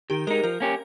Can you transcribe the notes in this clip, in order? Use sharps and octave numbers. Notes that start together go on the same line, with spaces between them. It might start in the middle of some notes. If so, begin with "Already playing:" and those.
D#3 G4
G#3 D#4 A#4
F3 A#4
A#3 C#4 G4